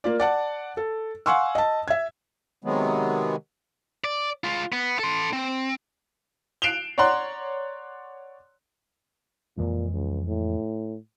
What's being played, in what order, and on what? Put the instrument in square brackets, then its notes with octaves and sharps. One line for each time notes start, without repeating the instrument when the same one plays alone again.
[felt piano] A#3 F4 D5
D5 F#5 A5
A4
F5 F#5 G#5 C6 C#6 E6
D#5 A5
E5 G#6
[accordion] C3 D#3 F#3 G#3 B3
[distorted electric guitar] D5
G#3 F4
B3
A4 C6
C4
[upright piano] F#6 C7 D7 E7 F7 G7
C#5 D5 F#5 A#5 C6 F#6
[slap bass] F2 E3 G#3 [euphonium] A#2
[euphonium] C#2
A2